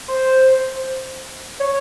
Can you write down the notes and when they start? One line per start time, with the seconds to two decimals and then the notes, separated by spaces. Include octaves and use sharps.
0.08 C5
1.60 C#5